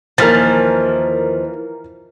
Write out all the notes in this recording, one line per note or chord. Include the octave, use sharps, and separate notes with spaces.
D#2 E3 F3 A#4 F6 A6